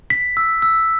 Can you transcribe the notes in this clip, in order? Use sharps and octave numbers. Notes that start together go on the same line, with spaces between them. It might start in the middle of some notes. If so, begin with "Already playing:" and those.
B6
E6
E6